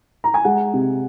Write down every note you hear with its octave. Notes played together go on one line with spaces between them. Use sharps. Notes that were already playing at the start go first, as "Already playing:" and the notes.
A#5
G#5
G#3 F#5
C3